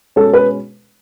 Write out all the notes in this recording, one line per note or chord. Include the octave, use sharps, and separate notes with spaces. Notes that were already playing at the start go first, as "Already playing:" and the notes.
B2 G#3 C#4 A4
B4